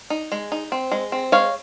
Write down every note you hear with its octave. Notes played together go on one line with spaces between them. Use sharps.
D#4
G#3
D#4
C4
G#3
C4
G#3 C#5 F5